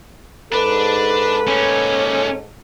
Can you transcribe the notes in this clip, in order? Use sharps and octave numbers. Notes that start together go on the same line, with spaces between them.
G#2 D4 A4 B4
A#2 A3 C#4